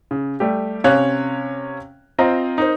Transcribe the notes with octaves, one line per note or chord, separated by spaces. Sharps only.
C#3
G3 A3 G4
C3 C#4 C#5 F5 F#6
C4 F4 C5 D#5 A#5
D#4 A#4 C5